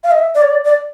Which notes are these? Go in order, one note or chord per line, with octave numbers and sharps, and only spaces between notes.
F5
D#5
E5
D5
C#5
D5
D5